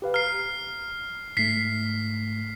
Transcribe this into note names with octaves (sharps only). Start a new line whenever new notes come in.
G4 B4 F5
A#5 F6 C7
G#2 A3 B6 C7